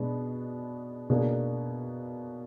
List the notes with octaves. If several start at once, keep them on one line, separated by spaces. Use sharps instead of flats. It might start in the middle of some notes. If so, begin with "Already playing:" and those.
Already playing: B2 G#3 B3 D4
B2 A#3 D4 G#4